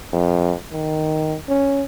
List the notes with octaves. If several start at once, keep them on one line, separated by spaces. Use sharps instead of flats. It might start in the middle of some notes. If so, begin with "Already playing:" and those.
F2
D#3
C#4